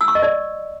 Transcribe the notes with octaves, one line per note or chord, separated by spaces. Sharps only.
E6
C#6
D#5
D5